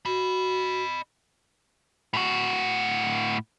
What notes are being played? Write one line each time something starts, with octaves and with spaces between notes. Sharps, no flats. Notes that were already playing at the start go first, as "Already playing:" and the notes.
F#4 D#5 B5
A2 F#4